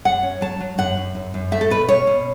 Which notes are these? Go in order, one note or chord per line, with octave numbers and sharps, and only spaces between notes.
F#2 F#5
C#4
F#3 A5
F#3
F#2 F#5
F#2
F#2
F#2
A3 E5
A4
B2 B4
C#4 C#5
B2